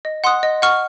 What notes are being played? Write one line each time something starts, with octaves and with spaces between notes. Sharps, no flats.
D#5
F#5 C6 D#6 F#6
D#5
F#5 C#6 F6